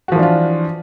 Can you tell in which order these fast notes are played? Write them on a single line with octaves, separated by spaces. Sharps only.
F#4 F3 E3 D4 F4